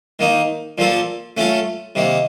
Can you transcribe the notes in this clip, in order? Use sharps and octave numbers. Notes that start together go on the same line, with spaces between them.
D#3 A#3 D#4
A#2 F3 A#3 F4 A4
A3 C#4 F4 A4
C3 D#3 A#3